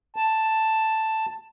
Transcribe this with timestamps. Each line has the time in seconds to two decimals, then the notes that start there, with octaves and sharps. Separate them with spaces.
0.16 A5